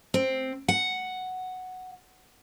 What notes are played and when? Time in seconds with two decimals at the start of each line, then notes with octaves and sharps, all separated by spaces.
0.14 C4
0.68 F#5